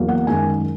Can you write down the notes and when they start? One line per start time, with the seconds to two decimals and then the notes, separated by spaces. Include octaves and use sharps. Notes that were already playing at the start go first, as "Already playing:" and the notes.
Already playing: E2 F#3 A#3
0.08 F#5
0.27 F#2 D#3 G#3 G#5